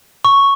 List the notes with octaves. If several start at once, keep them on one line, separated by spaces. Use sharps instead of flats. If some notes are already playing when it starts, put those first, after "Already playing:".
C#6